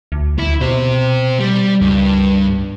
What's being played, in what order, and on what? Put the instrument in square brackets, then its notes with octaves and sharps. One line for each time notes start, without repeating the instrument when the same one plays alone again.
[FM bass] D2
[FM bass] D2 [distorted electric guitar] E4
[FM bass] B2 [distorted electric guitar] G4 C5
[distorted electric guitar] G3
[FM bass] C#2 [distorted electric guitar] G2